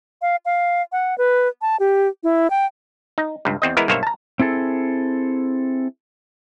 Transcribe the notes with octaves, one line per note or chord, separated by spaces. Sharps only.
F5
F5
F#5
B4
A5
G4
E4
G5
D#4
C#2 G2
E2 C4 D#5
E3 G#3 B3 E4 A#4
B1 G2 A#3 C5 C#5 E5
A5 A#5
C4 E4 G#4 A4